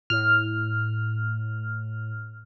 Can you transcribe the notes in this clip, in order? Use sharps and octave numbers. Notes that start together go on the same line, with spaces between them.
A2 F6